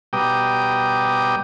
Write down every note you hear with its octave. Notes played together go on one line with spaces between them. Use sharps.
B2 G3 G5 A#5 D6 D#6